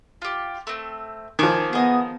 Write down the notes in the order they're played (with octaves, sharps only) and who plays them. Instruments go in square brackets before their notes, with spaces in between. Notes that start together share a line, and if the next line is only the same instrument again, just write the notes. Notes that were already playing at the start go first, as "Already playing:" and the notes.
[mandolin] F4 G4
A3 C4
[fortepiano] D#3 F3 [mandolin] G#5 D6
[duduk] B3 [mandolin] G#4 D#5